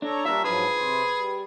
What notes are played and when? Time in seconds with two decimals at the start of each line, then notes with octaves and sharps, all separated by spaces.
0.02 D4 A4 C#5 A#5
0.25 G3 D4 F4 A#4 E5
0.44 G#2 F3 F#3 G#4 B4
0.75 C3 C5
1.15 G3